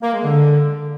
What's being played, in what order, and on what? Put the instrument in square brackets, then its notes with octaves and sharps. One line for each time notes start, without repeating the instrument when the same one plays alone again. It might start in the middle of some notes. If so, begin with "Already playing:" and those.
[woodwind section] A#3
G#3
D3